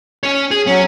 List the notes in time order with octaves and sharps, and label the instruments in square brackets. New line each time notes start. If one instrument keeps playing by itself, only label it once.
[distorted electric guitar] C#4 C#5
G#4
[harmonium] F#3 [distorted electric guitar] C#4